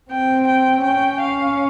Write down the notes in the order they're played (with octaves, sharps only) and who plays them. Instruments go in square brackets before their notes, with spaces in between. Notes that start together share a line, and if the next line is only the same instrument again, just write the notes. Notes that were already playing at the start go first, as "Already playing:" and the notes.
[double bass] C4 [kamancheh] G5
[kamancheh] G5
[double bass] C#4 [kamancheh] G5
[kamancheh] F5